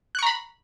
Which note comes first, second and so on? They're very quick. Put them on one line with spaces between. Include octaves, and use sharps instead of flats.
F#6 C#6 A#5 B5